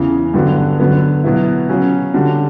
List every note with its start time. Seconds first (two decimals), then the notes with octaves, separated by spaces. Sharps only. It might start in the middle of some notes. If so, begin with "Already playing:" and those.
Already playing: E2 C#3 E3
0.34 G2 D3 F#3 B3 F#4
0.79 D3 F#3 B3
1.24 B2 F#3 B3 E4
1.69 C#3 F#3 C#4
2.14 D3 G3 D4 F#4